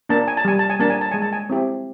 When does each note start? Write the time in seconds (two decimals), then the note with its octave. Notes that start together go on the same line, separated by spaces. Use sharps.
0.09 A#3 D4 A5
0.28 G#5
0.37 A5
0.45 G3 G#5
0.59 A5
0.70 G#5
0.79 A#3 D4 A5
0.90 G#5
1.01 A5
1.11 G#3 G#5
1.22 A5
1.33 G#5
1.50 C4 E4 G4